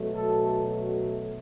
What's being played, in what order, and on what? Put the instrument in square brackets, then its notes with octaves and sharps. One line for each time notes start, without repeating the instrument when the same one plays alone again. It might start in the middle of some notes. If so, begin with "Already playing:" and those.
Already playing: [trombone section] B2 F#3 A3
A4